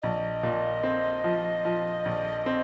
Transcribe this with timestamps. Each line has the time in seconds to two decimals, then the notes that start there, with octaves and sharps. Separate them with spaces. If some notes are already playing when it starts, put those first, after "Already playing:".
0.02 A#1 D#5
0.43 A#2
0.83 C4
1.24 F3
1.65 F3
2.05 A#1
2.46 C4